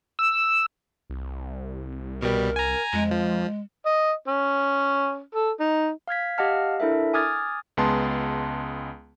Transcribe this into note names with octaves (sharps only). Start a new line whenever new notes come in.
E6
C2
B2 G3 A#4
G#5 A#5
F2 G#3
F3
D#5
C#4
A4
D#4
F5 F6 G#6 B6
G4 D#5 F5 F#5 A5 F6
D4 E4 A4 A#4 E5
G#5 D6 D#6 F6 G#6 A6
C#2 G#3 B3 A5 C6